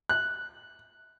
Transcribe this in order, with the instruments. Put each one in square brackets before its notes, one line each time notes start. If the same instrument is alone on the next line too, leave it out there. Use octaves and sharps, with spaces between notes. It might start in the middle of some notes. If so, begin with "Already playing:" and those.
[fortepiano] F#6